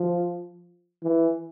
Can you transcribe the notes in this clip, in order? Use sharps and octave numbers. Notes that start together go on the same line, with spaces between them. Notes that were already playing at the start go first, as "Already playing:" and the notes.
Already playing: F3
E3